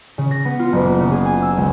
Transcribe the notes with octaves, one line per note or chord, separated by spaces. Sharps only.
C#3
A#6
B3
F4
F#1
A#3
C#3
G#4
G#5
E6
C#2